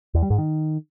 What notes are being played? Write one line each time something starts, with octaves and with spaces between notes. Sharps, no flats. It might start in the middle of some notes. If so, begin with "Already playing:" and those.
E2
G3
G#2
D#3